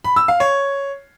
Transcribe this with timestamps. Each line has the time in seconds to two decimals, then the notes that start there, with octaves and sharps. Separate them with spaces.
0.04 B5
0.16 E6
0.28 F5
0.40 C#5